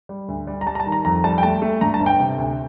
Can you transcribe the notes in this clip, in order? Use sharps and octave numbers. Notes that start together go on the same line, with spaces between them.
G3
D2
G3
A#5
G3 A5
A#5
A5
D#3
A#5
F2 A#5
G3 A5
G5
A3 A5
A3
G2 A#5
A5
G1
G5
C3
D2